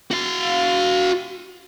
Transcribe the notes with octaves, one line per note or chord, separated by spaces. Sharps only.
F#4 F5